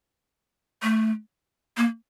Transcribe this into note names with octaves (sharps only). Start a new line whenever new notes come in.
A3
A#3